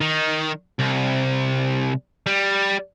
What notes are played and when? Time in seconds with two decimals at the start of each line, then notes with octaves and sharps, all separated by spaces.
0.01 D#3
0.79 C2
2.27 G3